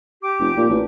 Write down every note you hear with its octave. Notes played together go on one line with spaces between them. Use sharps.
G4 D6
F1
A#2
A1